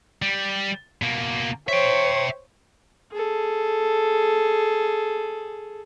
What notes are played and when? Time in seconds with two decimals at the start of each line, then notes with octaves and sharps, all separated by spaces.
0.22 G3
1.02 B2 A#3
1.69 C5 C#5 E5 G5
3.12 G#4 A4